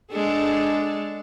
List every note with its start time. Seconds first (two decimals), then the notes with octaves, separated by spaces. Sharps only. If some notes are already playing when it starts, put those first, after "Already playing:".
0.12 G#3 D4 A4